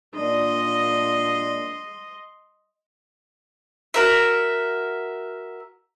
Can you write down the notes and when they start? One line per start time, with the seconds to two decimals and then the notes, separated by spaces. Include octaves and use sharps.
0.15 A#2 D4 D#5 C6
3.94 F#4 A#4 E5